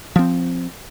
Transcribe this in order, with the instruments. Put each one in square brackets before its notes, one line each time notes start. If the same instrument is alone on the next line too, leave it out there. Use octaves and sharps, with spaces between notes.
[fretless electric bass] F3 C4